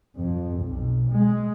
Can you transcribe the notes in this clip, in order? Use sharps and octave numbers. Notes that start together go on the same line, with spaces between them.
F2
B1
G#3